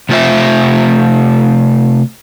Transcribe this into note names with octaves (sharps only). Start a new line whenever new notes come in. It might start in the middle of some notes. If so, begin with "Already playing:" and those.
C3 A3 F4 C5 E5